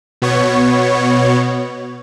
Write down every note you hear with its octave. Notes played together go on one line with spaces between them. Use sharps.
B2 B3 C#5